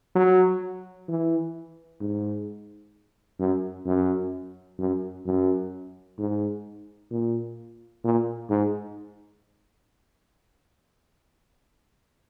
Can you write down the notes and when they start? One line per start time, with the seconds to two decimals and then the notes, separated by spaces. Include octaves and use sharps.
0.15 F#3
1.08 E3
2.01 G#2
3.39 F#2
3.86 F#2
4.79 F#2
5.26 F#2
6.19 G#2
7.11 A#2
8.04 A#2
8.50 G#2